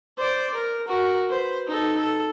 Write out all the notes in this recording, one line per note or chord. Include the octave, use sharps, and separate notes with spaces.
C5 D5
A#4
F#4 A#4
B4 C5
D#4 A4
A4